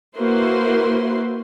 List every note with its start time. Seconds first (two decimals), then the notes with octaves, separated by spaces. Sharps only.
0.17 A#3 E4 F#4 B4 C5 C6